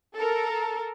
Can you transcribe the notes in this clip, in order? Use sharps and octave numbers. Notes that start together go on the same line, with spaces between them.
A4 A#4